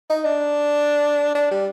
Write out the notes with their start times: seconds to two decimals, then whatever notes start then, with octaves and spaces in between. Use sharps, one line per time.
0.10 D#4
0.25 D4
1.35 D4
1.51 G3